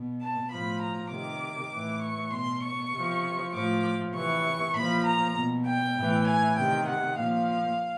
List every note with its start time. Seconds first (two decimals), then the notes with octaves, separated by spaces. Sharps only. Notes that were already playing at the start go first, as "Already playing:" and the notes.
Already playing: B2
0.21 A5
0.51 A2 F3 B5
0.81 A#5
1.12 C3 D#3 D6
1.72 A2 E3
2.02 C#6
2.33 B2 C6
2.64 C#6
2.94 C3 F3
3.54 A2 F3 D6
4.15 C3 E3 C#6
4.75 A#2 F3 B5
5.06 A#5
5.36 B2
5.66 G5
5.96 A2 E3
6.27 G#5
6.57 C3 D#3 G5
6.88 F#5
7.18 A#2 F3 F5